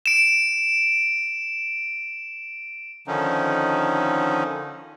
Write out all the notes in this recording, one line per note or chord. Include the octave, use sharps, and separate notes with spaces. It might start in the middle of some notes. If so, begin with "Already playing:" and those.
D7 E7
D3 D#3 F3 C#4 D#4